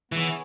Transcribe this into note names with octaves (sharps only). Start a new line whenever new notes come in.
E3 B3 G#4 C#5